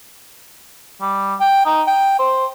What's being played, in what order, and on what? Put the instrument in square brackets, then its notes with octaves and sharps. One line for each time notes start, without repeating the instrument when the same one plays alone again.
[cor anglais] G3
G5
D#4
G5
C5